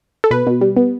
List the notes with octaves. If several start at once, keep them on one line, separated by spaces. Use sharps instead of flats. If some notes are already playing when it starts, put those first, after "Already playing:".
A4
B2 B4
B2
G3
B3